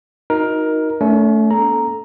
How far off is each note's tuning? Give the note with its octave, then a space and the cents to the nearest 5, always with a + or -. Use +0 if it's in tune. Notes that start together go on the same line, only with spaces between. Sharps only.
D#4 +15 F#4 -20 A#4 +15
A3 +0 C#4 +45
B3 -40 A4 -5 A#5 +0